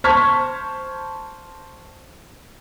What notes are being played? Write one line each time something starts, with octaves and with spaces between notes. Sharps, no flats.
C5 A5 C#6 F6 G#6 B6